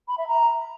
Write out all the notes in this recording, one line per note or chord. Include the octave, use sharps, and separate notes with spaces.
B5
E5
A#5